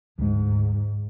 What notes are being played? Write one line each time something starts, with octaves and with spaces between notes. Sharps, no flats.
D2 G#2 G#3